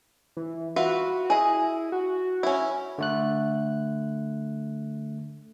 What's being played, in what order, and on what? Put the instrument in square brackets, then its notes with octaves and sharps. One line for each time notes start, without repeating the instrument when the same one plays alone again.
[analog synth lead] E3
[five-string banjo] F4 B4 E5 [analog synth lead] F#4
[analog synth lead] E4 [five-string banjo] G#4 D#5
[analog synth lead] F#4
[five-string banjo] C#4 E4
[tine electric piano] D3 A3 F#6